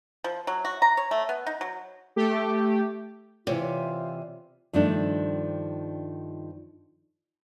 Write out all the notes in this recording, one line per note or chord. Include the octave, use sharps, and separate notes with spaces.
F3
F#3
F#4
A#5
C#5
A3
B3
D#4
F#3
A3 G4
C3 E3 F4 C#5 D5
G2 D#3 F3 A3 D4